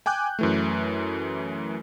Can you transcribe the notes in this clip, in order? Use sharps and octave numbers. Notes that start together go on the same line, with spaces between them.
G5 G#5 D6 F#6 G6
F#2 E3 A3